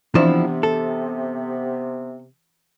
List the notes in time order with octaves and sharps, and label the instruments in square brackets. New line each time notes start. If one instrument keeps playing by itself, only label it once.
[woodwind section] C3 B3 [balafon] E3 C4 D4 [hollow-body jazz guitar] F3 E4
[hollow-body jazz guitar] A4